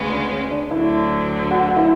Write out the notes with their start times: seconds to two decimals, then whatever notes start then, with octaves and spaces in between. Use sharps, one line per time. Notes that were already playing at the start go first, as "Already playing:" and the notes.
Already playing: D2 C#3 G#3 B3
0.11 D4
0.31 C#4
0.51 D4
0.71 D2 D3 F#3 E4
1.51 F#4
1.68 F#4
1.77 E4